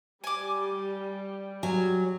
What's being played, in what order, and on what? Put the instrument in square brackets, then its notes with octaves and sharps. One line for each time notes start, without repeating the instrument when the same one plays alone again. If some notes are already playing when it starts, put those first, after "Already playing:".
[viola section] G3 [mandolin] G#5 D6
[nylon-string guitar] F#3 [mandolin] G#5